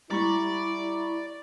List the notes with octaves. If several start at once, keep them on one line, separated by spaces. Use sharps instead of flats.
G3 E4 D5 A#5 B5 C#6